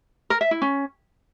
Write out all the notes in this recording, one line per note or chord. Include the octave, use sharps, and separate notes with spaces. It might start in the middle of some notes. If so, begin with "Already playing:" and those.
A#4
E5
E4
C#4